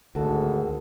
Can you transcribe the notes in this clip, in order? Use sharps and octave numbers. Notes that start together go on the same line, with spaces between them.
G#1 D2 F#4 A4